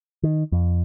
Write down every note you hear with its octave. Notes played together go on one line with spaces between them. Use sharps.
D#3
F2